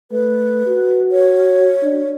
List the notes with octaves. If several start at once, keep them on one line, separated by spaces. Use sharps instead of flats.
A3 B4
F#4
C#5
D4